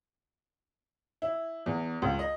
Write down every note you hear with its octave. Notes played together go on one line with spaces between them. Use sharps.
E4
E2
C#2
D#5